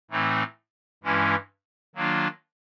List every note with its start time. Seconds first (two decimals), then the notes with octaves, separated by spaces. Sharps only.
0.11 A2 E3 A3 C4 D#4
1.04 G2 E3 G#3 C#4 E4
1.95 D#3 F#3 A#3 D4 F4